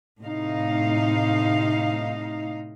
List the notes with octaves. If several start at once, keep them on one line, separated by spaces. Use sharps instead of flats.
A2 C3 D#4 F5